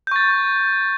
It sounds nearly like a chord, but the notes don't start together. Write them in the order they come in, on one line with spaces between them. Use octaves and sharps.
G6 C#6 A6